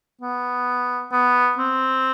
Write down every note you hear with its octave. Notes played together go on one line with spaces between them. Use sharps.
B3
B3
C4